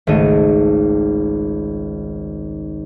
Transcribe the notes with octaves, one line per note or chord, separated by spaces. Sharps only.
G#1 C#2 A3 D#5 D#7